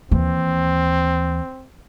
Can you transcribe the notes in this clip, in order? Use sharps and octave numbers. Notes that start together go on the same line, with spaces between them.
D#2 E3 C4